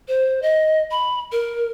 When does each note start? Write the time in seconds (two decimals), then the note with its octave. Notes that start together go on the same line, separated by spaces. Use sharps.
0.08 C5
0.42 D#5
0.91 B5
1.32 A#4